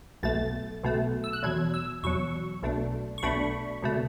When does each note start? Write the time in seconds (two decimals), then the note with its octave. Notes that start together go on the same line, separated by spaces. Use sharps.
0.23 B1 B2 A3 A6
0.83 B1 B2 A3
1.24 E6
1.33 F#6
1.43 E2 B2 F#3 G#6
1.74 E6
2.03 E2 B2 F#3 C#6
2.63 B1 B2 A3 D4
3.18 C#6
3.23 B1 B2 A3 D4 B5
3.82 C#2 B2 A3